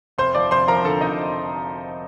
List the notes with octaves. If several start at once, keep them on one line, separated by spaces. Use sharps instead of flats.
F1 C5 C6
F3 D5 D6
F1 C5 C6
F3 A#4 A#5
D3 A4 A5
F1 D#4 D#5